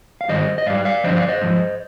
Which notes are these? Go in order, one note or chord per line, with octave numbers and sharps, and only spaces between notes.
F5
G#2 D#3 G3 C5 D#5
D#5
G#2 G3 D5 F5
D5 F5
G2 D3 F3 C5 D#5
D5 F5
C5 D#5
G#2 F3